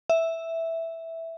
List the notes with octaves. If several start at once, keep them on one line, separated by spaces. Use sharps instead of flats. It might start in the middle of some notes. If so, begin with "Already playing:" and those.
E5